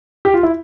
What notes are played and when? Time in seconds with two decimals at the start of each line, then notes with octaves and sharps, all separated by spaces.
0.25 G4
0.34 F4
0.43 E4